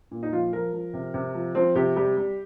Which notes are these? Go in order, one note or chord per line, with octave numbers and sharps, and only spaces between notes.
A#2
D#4
F3 F4
F3 A#4
F3
C3
C3
F3
F3 C4
C3 G4
G3 G4
G3